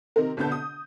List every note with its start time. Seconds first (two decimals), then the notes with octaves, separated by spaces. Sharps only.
0.16 C3 D#3 C4 A#4
0.37 G1 B2 D3 B3 A5 G6
0.52 D#6